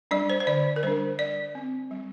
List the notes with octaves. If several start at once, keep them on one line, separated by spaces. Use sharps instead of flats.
G3 D4 D5
C5
C5
D3 D5
A#4
G3 D4 C5
G3 D5
C4
G3